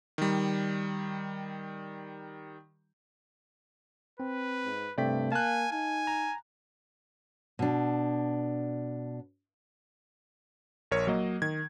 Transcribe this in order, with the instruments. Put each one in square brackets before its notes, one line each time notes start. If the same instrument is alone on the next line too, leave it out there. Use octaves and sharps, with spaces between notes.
[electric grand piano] D#3 G3
[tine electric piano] C4 [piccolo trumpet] B4
[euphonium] G#2
[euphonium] G2 [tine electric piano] C3 A3 C4 [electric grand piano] D5 G5 B6
[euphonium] A#3 [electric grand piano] F5 F#6 [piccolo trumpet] G#5 [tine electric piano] A5
[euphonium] D#4 [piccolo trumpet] G#5
[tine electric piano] A#5
[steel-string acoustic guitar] B2 D4
[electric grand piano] A#1 A#4 C#5
F#3 A#3 D#5
D#3 G#6